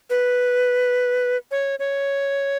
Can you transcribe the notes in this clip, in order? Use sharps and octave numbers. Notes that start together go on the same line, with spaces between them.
B4
C#5
C#5